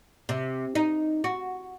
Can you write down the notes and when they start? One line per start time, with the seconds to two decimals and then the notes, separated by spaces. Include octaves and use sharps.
0.29 C3
0.75 D#4
1.24 F#4